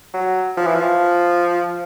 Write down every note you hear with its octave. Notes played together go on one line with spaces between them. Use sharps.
F#3
F3
E3
F3